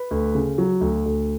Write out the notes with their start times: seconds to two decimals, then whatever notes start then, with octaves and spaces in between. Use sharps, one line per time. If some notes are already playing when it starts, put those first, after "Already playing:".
Already playing: B4
0.11 D2
0.35 C#3
0.58 F#3
0.81 D2
1.06 D2